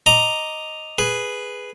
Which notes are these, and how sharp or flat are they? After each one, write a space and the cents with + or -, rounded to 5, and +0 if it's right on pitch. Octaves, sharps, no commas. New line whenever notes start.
D#5 +0 A#5 +0 D6 +0
G#4 +0 B4 +0